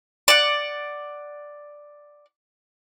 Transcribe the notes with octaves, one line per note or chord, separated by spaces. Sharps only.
D5 F#5